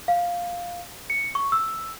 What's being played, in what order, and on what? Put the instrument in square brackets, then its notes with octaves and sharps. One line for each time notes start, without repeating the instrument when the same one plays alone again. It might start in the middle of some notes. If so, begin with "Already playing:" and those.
[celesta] F5
C#7
C#6
E6